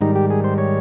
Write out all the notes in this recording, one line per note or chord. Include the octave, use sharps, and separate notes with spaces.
G#2 D#3 G3 D#4
G4
G#4
C5
C#5